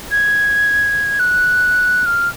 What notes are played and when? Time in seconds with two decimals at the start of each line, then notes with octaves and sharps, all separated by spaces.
0.11 G#6
1.19 F#6
2.06 F6